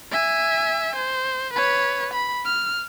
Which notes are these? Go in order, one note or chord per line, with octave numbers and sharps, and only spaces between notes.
E5 G#5
C5
B4 C#5
B5
F6